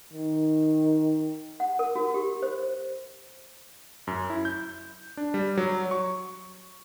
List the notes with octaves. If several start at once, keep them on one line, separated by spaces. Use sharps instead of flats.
D#3
F#5
A#4
F#4
G4
C5
F#2
E4
G6
D4
G3
F#3
C#6